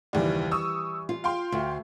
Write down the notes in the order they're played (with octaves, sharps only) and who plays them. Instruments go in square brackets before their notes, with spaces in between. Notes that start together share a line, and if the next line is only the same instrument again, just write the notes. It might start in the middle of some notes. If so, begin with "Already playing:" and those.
[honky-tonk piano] F#1 D#2 [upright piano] E3 G3 D5
[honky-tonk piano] C#6 D#6 E6
[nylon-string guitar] F4
[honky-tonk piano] F5 G5 C6
[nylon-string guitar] D2